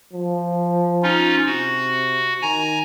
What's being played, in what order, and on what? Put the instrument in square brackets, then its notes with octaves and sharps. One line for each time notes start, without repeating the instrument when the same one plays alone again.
[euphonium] F3
[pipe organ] C#4 D#4 F4
[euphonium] C3 [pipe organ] F#4
[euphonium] D#3 [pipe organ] G#5 A#5